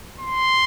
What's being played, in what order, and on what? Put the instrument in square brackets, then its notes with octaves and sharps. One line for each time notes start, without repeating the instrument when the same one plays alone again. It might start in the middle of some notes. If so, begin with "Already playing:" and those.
[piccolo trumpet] C6